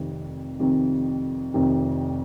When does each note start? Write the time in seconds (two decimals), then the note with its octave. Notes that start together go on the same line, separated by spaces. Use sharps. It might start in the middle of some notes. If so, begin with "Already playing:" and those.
Already playing: F1 F2 C3 D#3
0.59 F1 F2 C3 D#3
1.54 F1 F2 C3 D#3